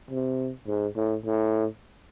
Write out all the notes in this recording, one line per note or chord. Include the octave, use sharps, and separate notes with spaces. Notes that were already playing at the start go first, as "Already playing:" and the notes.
C3
G#2
A2
A2